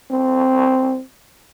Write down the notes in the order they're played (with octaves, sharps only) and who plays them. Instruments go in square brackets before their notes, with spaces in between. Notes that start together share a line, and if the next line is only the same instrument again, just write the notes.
[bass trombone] C4